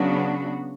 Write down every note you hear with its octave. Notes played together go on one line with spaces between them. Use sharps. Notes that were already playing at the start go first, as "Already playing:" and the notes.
Already playing: C#3 F#3 B3 D4 F#4